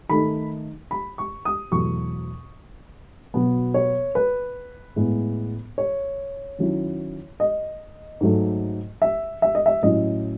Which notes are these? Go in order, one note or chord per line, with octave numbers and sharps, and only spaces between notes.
D#3 A3 D#4 B5
B5
C#6
D#6
E2 B2 F#3 A3 C#6
B2 F#3 B3
C#5
B4
A2 G#3 B3
C#5
D#3 F#3 C#4 E4
D#5
G#2 F#3 A3
E5
E5
D#5
E5
A2 F#3 C#4 E4 D#5